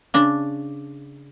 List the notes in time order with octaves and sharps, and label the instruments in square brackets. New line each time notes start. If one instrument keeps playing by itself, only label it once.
[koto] C#3 D4